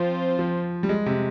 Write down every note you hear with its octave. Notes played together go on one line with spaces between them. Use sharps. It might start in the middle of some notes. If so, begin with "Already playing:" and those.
Already playing: F3 C4 F4 C5
F3
G3
G#3
C3